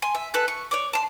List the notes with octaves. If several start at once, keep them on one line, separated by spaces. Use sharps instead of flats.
G#5 C6
E5
A4 B4 F#6
C#6
C#5 D5 D6
A5 C6